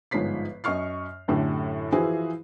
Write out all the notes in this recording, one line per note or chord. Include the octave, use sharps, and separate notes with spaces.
G1 G#2 F3 C#5 B6 C7
F#2 D#5 C#6 F6 C7
F#2 A2 D3 G4
E3 F3 E4 F#4 G#4 C5